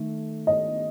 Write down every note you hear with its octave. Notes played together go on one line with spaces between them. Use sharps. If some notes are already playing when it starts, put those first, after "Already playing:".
Already playing: D#3 A3
D#5